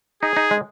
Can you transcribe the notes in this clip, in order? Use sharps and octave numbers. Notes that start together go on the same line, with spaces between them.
D#4 G#4
D#4
G#3